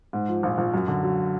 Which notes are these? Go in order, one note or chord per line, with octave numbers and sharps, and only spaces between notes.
G#2
F3
A#1
A#1
F#2
D3
F#3